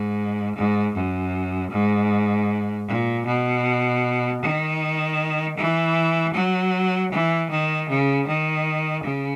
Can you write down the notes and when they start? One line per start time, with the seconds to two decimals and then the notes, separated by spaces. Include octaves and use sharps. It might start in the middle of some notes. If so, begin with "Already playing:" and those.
Already playing: G#2
0.56 G#2
0.94 F#2
1.70 G#2
2.87 A#2
3.25 B2
4.41 D#3
5.57 E3
6.34 F#3
7.11 E3
7.50 D#3
7.88 C#3
8.26 D#3
9.03 C#3